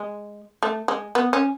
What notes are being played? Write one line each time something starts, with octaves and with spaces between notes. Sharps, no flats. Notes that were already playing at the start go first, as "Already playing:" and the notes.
Already playing: G#3
A3
G#3
B3
C#4